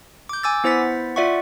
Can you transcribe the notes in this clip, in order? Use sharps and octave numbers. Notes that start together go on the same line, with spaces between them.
D6 G6
G#5 D6 E6 A6
B3 E4 C5 F#5 A6 B6
F4 D5 E5 F#5 C#6